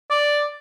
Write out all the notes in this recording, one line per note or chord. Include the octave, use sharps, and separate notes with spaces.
D5